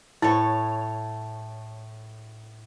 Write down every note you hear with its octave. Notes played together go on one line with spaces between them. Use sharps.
A2 E4 A4 C#5 A5